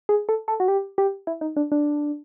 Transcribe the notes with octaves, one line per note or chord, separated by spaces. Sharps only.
G#4
A4
A4
F#4
G4
G4
E4
D#4
D4
D4